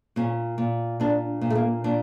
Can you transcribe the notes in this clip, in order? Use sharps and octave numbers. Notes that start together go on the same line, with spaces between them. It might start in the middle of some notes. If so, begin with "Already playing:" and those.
A#2 C#4
A#2
A#2 D4
A#2
A3
A#3
A#2 D4